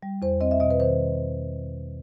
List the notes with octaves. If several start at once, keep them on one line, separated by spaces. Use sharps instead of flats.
G3
E2 C5
C4 D#5
E5
B2 D#5
B4
D#3 C5